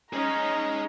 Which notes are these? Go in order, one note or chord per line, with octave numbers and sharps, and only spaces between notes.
C#4 D#4 G#4 D#5 A#5